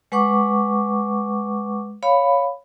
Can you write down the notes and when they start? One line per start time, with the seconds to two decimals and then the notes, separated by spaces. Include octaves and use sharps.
0.12 G#3 B4 F#5 C#6 D6
2.03 C#5 F5 B5